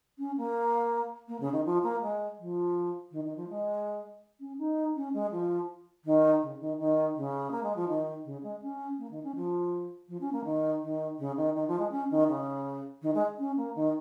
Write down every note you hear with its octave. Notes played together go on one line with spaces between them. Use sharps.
C#4
A#3
A#3
C#3
D#3
F3
A#3
G#3
F3
D#3
D#3
F3
G#3
C#4
D#4
C#4
G#3
F3
D#3
C#3
D#3
D#3
C#3
A#3
G#3
F3
D#3
C#3
G#3
C#4
A#3
D#3
C#4
F3
F3
C#4
A#3
D#3
D#3
C#3
D#3
D#3
F3
G#3
C#4
D#3
C#3
D#3
G#3
C#4
A#3
D#3